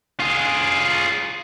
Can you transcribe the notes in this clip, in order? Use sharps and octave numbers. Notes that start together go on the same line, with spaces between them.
F4 G#4